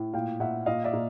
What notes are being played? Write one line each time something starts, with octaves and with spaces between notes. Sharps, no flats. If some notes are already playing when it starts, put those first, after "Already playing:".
Already playing: A2
A#2 F5 G5
A#2 E5 F#5
A#2 D#5 F5
D5 E5
A#2